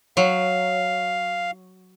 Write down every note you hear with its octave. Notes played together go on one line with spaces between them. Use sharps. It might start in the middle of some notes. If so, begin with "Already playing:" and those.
F#3 F5